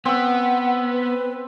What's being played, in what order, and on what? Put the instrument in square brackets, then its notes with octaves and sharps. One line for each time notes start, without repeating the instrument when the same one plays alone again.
[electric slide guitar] B3 [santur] C4 E6 [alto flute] F#5
[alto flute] B4